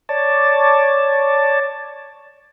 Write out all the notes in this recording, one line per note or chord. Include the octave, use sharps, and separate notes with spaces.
C#5 D5 A5